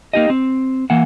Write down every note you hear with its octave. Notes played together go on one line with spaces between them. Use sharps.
A#3 D#4 G4 D#5
C4
E3 A#3 F#5